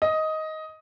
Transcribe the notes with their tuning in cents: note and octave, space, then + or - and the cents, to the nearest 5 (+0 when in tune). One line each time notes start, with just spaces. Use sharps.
D#5 +10